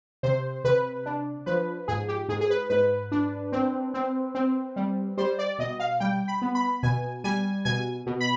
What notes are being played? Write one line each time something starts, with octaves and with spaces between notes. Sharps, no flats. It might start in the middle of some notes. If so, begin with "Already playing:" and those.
C3 C5
C3 B4
D4
F3 B4
G#2 G#4
G4
G#2 G#4
G#4
B4
G#2 B4
D4
C4
C4
C4
G3
G3 C5
D5
B2 D#5
F5
G3 G5
B5
B3
B5
B2 G#5
G3 G#5
B2 G#5
B2
B5